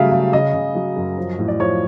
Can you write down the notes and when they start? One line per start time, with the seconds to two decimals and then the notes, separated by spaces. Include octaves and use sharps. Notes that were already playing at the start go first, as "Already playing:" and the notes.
Already playing: C#3 F#3 G3 A3 E5 F5
0.12 C#3
0.33 C#3 D#5
0.54 C#3
0.75 F#3
0.96 F#2
1.18 F3
1.39 A2
1.48 D5
1.60 F3 C#5